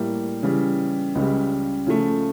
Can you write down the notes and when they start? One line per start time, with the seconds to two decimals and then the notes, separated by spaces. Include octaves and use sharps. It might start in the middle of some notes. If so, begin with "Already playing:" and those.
Already playing: A2 G3 A#3
0.43 C#3 E3 G3
1.15 C#2 C#3 G3
1.86 C#3 F3 A3